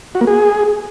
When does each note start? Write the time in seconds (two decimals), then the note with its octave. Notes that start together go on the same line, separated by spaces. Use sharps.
0.15 F#4
0.21 A#3
0.27 G#4